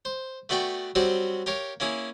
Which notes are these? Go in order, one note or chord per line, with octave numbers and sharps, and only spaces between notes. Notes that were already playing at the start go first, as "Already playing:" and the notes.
C5
A3 B3 F#4 D5 G5
F#3 G3 C4 F#4 G4 C5
G4 A#4 C#5 F5
A#3 C#4 E4 G#4